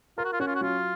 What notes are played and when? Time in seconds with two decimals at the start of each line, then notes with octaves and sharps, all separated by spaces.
0.18 F4 A#4
0.24 F#4
0.33 F4
0.40 C#4 F#4
0.47 F4
0.55 F#4
0.61 F#3 F4